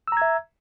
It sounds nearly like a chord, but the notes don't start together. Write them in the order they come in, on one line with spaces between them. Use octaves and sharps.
E6 A#5 G#6 E5